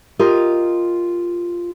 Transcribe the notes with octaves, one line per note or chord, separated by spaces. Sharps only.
F4 G4 A#4 D#5